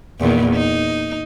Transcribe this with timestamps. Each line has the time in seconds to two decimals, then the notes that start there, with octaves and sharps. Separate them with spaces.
0.20 E2 A#2 D#3
0.54 D#4